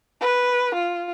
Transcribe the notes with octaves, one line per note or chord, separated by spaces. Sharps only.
B4
F4